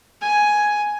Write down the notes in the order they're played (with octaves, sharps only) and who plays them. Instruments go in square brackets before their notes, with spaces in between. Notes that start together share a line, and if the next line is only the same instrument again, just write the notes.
[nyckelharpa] G#5